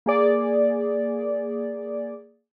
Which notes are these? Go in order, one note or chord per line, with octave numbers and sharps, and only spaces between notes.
A#3 G#4 D5